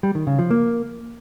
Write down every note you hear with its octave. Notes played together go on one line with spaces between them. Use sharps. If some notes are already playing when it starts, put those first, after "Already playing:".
G3
D#3
C#3
F3
A#3